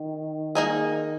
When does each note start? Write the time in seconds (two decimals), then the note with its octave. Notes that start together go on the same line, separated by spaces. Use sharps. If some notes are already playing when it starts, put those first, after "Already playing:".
Already playing: D#3
0.55 A#3 D#4 G#4